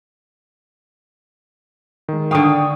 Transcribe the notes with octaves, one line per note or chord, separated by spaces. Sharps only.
D#3 G#3
D3 F5 G5 C#6 D#6